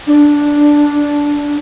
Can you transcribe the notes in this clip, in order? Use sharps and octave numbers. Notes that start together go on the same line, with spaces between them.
D4